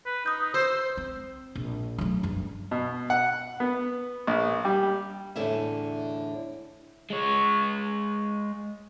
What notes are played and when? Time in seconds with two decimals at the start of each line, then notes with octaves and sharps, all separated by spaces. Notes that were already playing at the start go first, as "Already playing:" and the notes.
0.06 B4
0.26 D#4 D#6 G6
0.54 C5 E6
0.97 C4
1.55 A#1
1.98 F#3 A3
2.23 F#1 G2
2.71 B2
3.10 F#5
3.60 B3
4.27 A#1
4.65 G3
5.36 E2 A2 D3 E4 E5
7.10 G#3 C#5